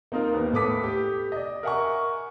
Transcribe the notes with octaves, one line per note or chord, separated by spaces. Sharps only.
A#3 C4 D#4 F4 A#4
D#2 B3
A2 B3 A4 D6 D#6 B6
G4
D5 D#5
A#4 E5 F#5 G#5 C#6